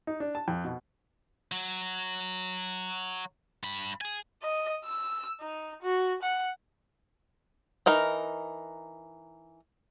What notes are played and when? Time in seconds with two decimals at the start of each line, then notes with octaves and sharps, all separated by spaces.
0.07 D#4
0.20 D4
0.35 A5
0.48 F2
0.65 B2
1.52 F#3
3.63 G2 B5
4.01 G#4 G#5
4.42 D#5
4.85 E6
5.41 D#4
5.82 F#4
6.22 F#5
7.86 E3 D#4 A#4 A#5